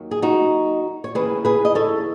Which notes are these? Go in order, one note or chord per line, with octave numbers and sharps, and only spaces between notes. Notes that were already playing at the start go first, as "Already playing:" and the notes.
Already playing: D#2 D#3 F#3
G#4
D#4 F#4
C#5
D#2 C#3 E3 G#4 B4
G#4 B4
D#5
A4 C#5